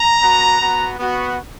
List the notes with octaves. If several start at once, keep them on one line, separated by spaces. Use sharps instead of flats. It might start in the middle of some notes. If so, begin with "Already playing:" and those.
Already playing: A#5
B3 F#4
B3 F#4
B3 F#4